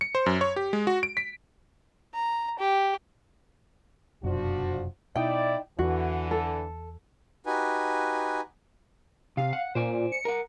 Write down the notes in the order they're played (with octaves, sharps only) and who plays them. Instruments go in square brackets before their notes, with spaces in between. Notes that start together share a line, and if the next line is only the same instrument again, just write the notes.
[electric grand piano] C#7
C5
F#2
C#5
G4
G#3
F#4
D7
B6
[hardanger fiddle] A#5
G4
[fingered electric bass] F1 F#2 B2 [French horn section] F3 D4 F#4
[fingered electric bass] B2 [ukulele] D#4 G5 [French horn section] E4 D5
[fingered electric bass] E2 [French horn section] D3 E3 [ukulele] F#4
[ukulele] A4
[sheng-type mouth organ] D#4 F#4 G4 B4 G#5
[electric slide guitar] C3 [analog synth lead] F5
[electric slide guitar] F#5
[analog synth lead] A#2 [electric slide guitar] C5 D5 G#5
[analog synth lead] C#7
[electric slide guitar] A#4 F#5